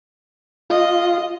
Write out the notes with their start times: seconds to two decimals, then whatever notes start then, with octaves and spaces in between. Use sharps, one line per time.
0.70 F4 D#5